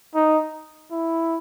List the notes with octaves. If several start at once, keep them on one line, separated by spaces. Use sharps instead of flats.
D#4
E4